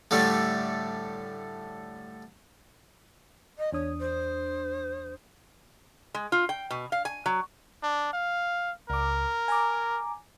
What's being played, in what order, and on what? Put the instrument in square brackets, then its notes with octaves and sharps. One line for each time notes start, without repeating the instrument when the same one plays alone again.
[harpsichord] A2 D3 G3 A3
[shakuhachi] D#5
[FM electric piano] E2 D4 D#6 [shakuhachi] C#5
[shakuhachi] C5
[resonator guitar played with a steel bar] G#3
F4
G5
B2
F5
G#5
F#3
[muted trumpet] D4
F5
[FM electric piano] C#2 D6 [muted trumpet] A#4
[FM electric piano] G#5 A#5 D6